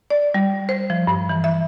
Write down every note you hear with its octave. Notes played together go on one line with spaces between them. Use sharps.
D5
G3
C5
F3
G2
E3
E5